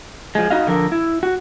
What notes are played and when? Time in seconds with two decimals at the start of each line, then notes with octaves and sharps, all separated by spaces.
0.35 F3 G#3
0.50 D#4 F#4 D#5 F5
0.67 D3 F3 A#4
0.92 E4
1.23 F#4